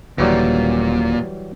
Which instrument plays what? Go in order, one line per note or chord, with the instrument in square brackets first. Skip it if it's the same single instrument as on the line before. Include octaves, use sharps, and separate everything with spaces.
[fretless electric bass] D#1 D3 [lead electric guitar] A#2 [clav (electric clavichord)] E3 F#3 G3